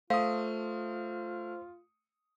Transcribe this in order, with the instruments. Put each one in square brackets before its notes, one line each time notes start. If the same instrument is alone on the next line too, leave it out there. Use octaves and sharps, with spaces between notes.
[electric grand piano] A3 D#6 [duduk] F4 [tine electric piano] C5 [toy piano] F5